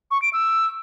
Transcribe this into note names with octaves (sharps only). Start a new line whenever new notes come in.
C#6
D7
E6